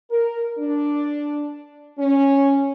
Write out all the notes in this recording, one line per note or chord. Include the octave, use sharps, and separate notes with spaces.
A#4
D4
C#4